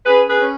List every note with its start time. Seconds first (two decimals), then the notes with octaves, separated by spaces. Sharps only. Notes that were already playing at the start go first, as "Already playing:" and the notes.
0.06 C#4 G#4 B4
0.28 G#4 B4
0.39 C#4